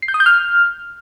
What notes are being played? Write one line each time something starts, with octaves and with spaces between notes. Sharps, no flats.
C7
G6
D#6
G6
F6